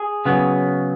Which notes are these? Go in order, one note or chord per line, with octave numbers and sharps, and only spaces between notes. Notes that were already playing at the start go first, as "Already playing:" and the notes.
Already playing: G#4
C#3 F#3 B3